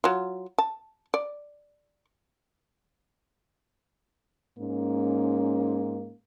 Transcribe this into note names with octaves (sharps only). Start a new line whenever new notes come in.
F#3 F4
A5
D5
G#2 A#3 C#4